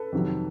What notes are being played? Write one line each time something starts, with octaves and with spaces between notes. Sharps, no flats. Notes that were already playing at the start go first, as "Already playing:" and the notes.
Already playing: A4 B4
F2 C3 D#3 F#3